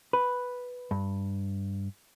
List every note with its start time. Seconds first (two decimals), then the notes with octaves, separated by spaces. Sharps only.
0.13 B4
0.91 G2